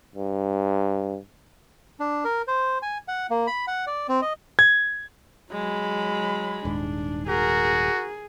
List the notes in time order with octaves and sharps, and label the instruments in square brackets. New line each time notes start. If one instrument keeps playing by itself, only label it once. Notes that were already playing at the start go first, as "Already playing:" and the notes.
[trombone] G2
[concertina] D4
A#4
C5
G#5
F#5
A#3
B5
F#5
D5
C4
D#5
[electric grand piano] G#6
[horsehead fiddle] F#3 B5 [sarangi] G#3
[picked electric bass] D#1 G#2 [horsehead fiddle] D4
[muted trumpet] F#4 [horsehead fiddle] G#4 [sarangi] A#4